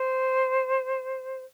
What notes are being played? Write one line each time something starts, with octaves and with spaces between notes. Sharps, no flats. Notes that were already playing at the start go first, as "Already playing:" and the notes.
Already playing: C5